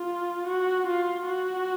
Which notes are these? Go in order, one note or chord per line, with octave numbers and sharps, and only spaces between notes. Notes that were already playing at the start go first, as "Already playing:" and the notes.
Already playing: F4
F#4
F4
F#4